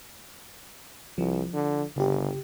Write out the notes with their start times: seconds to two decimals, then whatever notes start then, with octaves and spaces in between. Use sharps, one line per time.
1.18 C2 F3
1.54 D3
1.96 G1 C#3 G4